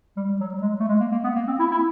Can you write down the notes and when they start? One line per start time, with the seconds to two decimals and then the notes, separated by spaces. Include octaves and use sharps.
0.17 G3
0.29 G3
0.40 F#3
0.53 G3
0.61 G#3
0.80 A3
0.88 G#3
1.00 A#3
1.11 A#3
1.24 B3
1.35 A#3
1.47 C4
1.59 E4
1.71 E4